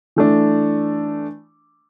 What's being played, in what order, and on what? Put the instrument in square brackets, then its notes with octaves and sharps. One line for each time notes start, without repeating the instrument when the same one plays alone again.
[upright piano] E3 A3 D4